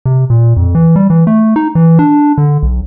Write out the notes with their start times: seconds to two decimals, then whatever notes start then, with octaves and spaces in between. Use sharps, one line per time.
0.06 C3
0.30 A#2
0.57 F2
0.75 E3
0.96 G3
1.10 E3
1.27 A3
1.56 D#4
1.75 E3
1.99 D4
2.38 D3
2.63 B1